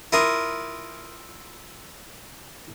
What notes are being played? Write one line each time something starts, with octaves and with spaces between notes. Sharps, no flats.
E4 F4 A#4 F5 D#6